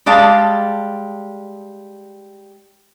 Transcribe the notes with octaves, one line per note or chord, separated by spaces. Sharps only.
G3 G#3 D5 F5 A5